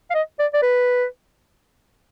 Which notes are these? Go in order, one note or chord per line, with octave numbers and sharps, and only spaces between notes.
F5
D#5
D5
D5
B4